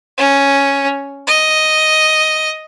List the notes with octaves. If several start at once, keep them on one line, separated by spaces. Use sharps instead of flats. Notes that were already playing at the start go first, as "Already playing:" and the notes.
C#4
D#5